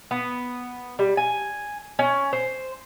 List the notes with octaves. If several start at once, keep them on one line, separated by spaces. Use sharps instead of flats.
B3
G3
G#5
C#4
C5